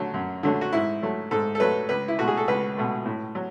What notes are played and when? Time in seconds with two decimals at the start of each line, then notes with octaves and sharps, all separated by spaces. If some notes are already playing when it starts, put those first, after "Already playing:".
Already playing: D3 F#3 A3
0.14 F#2
0.43 D3 F#3 A3
0.61 F#4
0.73 G#2 E4
1.03 F#3 A3
1.31 G#2 A4
1.55 A4
1.60 F#3 A3 B4
1.89 C#2 B4
2.08 E4
2.18 B2 A3 F#4
2.27 G#4
2.37 A4
2.48 C#2 B4
2.77 B2 A3
3.05 A2
3.35 F#3